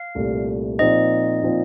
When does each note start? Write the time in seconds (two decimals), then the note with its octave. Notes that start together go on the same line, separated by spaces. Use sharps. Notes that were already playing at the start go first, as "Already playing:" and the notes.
Already playing: F5
0.15 C2 A#2 A3
0.79 A#2 F3 C4 D#4 D#5
1.43 A#2 F3 C4 D#4